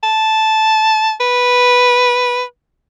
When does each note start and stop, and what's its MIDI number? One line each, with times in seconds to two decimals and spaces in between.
0.03 1.13 81
1.20 2.42 71